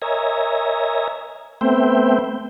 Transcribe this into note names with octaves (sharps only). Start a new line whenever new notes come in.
A#4 C#5 D#5 E5 G#5 A#5
A3 B3 C4 C5 E5 G5